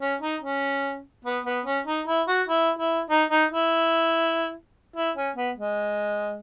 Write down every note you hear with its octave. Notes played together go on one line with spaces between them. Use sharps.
C#4
D#4
C#4
B3
B3
C#4
D#4
E4
F#4
E4
E4
D#4
D#4
E4
E4
C#4
B3
G#3